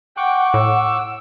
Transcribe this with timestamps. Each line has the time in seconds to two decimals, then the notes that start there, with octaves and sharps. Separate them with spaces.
0.17 F#5 G5 C#6 D6 F#6
0.54 A2 E6